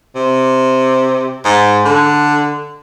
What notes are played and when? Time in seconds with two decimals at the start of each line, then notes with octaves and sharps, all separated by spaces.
0.15 C3
1.45 G#2
1.85 D3